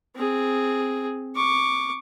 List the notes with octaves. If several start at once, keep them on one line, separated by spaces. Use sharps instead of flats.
C4 G#4
C#6 D6